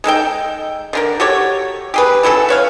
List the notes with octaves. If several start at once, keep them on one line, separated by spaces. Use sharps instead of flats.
G#3 D#4 A4 G5
D3 E3 A#4
F#4 G4 A4 C#5
G4 G#4 B4
E3 F#3 C#4 A4
B4 C#5 F5